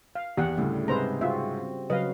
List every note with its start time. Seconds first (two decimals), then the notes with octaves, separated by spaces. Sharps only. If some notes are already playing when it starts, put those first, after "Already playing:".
0.15 F5
0.37 E2 G4 F#5
0.58 D2 A2 C#3 G3
0.88 G#2 C3 G#4 B4 C5 A#5
1.21 C4 F4 F#4 E5
1.90 C#3 F#3 B4 D#5 F5